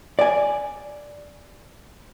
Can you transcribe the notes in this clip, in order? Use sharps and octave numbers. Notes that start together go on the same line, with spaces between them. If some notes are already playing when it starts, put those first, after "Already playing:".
D5 G#5